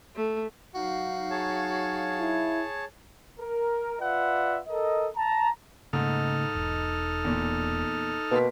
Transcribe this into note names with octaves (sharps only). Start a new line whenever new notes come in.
A3
F#3 D#4 F#4 F5
G#4 C#5 A5
E4
A#4
F4 B4 D5 E5 F#5
A4 A#4 D#5
A5 A#5
G#2 C#3 A3 A#3 D#4 A4 F6
E1
E2 A#2
B2 A#3 C6 B6